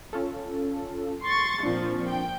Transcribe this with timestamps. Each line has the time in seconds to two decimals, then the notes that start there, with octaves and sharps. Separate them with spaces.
0.13 C#4 F4 A4
1.23 C6 C#6 A6
1.63 A#2 F3 C4 D4
2.07 G5